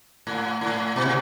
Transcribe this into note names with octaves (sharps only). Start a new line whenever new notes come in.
A2
A2
B2
C3